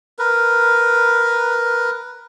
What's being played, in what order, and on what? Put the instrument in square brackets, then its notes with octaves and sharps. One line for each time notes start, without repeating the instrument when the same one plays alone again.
[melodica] A#4 B4